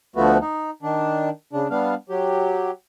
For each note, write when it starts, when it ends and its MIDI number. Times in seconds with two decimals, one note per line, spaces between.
0.16 0.38 38
0.16 0.38 53
0.16 0.38 57
0.16 0.38 59
0.16 0.38 66
0.41 0.70 63
0.83 1.29 51
0.83 1.29 62
1.53 1.67 49
1.53 1.67 62
1.70 1.94 55
1.70 1.94 59
1.70 1.94 62
1.70 1.94 77
2.09 2.71 54
2.09 2.71 67